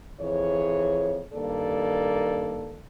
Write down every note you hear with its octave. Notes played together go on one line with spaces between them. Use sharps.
F2 E3 G#4 C#5
G2 D#3 A#3 A4 D5